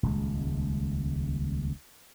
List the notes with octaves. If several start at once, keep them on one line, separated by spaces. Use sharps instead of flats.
D#1 C#2 G#3